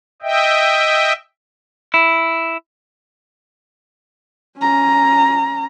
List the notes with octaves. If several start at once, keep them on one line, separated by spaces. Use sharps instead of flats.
D#5 E5 G5
E4
C#4 A#5